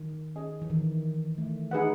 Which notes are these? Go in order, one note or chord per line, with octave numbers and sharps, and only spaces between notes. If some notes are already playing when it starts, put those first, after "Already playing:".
Already playing: D#3
C#4 G#4 D#5 G#5
E3
D#3
A3
D#4 G#4 B4 F#5